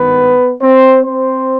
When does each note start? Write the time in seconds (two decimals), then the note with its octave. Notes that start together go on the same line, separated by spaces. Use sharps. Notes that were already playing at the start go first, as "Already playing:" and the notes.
Already playing: G#1 G2 D#3 B3 B4
0.61 C4 C5
1.04 C4 C5